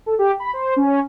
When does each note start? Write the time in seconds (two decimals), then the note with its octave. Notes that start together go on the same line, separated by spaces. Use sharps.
0.06 A4
0.19 G4
0.40 B5
0.53 C5
0.76 C#4